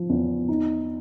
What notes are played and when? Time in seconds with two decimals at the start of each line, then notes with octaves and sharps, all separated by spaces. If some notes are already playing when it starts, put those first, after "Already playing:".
Already playing: F3
0.09 E2
0.48 D#4